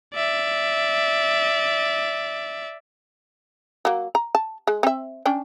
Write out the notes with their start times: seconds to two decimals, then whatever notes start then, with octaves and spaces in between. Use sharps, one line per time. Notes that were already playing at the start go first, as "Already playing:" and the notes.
0.14 D5 E5
3.85 F#3 A#3
4.15 A#5
4.35 A5
4.67 G#3
4.83 C4 E5
5.26 C#4 D4 G5